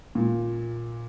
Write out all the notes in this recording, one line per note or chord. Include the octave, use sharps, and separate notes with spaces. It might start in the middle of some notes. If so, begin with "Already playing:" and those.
A#2